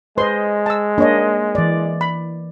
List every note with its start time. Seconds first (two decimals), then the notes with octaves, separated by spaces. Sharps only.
0.18 G#3 B4 C5 D#5 C6
0.66 A5 E6
0.98 A#3 D4 C#5 D#5
1.55 E3 D5
2.01 B5